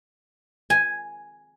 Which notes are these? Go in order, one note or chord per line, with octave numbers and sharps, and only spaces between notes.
G#5